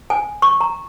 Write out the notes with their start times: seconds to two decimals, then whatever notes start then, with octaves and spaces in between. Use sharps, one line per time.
0.10 G#5
0.42 C#6
0.61 A#5